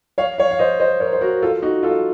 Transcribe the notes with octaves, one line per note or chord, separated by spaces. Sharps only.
C#5 F5
C#5 F5
F5
C5 D#5
C5 D#5
A#4 C#5
C5
F#4 A#4
F4 A4
D#4 F#4
F4 A4